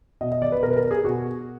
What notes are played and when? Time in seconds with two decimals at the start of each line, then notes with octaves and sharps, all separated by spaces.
0.21 B2 D#5
0.32 D#5
0.42 D5
0.52 B4
0.63 B2 A#4
0.71 B4
0.77 A#4
0.91 G#4
1.05 B2 F#4